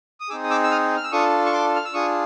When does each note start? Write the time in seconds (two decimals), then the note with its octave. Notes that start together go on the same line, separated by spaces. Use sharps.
0.20 D#6
0.30 C4 D#4 G#4 D6 E6
0.44 D#6
0.50 D6 E6
0.63 E6
0.71 D#6 F6
0.97 F6
1.04 E6
1.12 D4 F4 A4 C#6 D#6
1.46 C#6
1.53 C6 D6
1.76 F6
1.85 E6
1.94 D4 F4 G#4 C#6 D#6